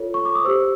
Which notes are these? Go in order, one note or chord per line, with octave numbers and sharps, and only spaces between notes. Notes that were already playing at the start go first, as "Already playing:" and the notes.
Already playing: F4 A4 C#5
C#6
D6
D#6
G4 C5 E6